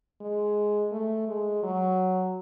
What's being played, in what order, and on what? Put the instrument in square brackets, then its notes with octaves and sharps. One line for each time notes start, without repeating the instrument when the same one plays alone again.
[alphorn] G#3
A3
G#3
F#3